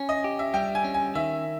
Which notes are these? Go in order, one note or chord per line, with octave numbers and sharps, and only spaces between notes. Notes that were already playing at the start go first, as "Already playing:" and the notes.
Already playing: C#4
D#5
G4
E5
G3 G5
G#5
C#4
G#5
D#3 E5